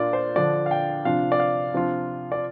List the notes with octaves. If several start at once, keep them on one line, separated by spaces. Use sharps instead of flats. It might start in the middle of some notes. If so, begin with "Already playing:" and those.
Already playing: A#2 A#3 D4 F4 D5
C5
D3 F3 D4 D5
F5
G5
C3 F3 D4 F4 F5
D5
F5
C3 F3 D4 F4
D5